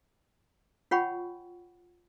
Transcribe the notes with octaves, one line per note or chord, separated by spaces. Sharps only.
F4 C#5 F#5 G5 B5 C#6